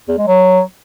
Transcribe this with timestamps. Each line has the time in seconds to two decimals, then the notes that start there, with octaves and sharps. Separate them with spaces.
0.08 E2
0.18 G#3
0.27 F#3